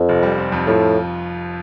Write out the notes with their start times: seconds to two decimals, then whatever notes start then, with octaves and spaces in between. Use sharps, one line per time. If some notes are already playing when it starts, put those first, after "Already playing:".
Already playing: F2
0.09 F1
0.23 G3
0.38 C4
0.52 F2
0.67 A2 F3